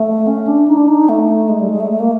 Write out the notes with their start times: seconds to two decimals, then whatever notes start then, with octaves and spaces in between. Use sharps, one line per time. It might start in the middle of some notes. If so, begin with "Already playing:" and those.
Already playing: A3
0.27 C#4
0.47 D4
0.68 D#4
0.77 D4
0.88 D#4
1.09 A3
1.49 G#3
1.60 G3
1.70 G#3
1.80 A3
1.90 A3
2.00 A#3